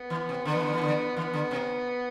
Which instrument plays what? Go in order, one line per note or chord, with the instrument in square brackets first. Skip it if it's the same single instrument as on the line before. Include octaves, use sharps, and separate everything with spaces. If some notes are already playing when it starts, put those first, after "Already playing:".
Already playing: [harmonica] B3
[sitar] E3
C3
[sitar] D3 [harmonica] B3
[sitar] E3
D3
E3
D3
[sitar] E3 [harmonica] B3
[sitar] D3
C3